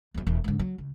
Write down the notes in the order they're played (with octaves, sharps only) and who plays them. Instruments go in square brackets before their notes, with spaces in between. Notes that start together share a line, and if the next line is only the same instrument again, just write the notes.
[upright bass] E2 F#3
E1 E2
G#2 D3
F#3
C#2